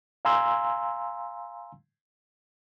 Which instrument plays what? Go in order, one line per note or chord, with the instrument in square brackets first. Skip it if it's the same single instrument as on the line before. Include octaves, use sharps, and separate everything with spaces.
[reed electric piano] F5 G#5 A#5 C6 E6